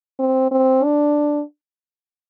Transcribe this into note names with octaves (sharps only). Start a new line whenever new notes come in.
C4
C4
D4